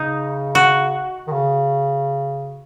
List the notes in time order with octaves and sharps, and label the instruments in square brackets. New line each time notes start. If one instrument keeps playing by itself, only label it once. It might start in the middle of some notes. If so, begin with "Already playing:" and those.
Already playing: [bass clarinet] C#3 [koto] D#4
[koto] F#4
[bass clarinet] D#3
C#3